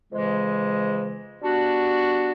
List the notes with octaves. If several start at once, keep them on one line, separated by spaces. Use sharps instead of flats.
F2 C#3 E3 G#3
G3 B3 D4 F#4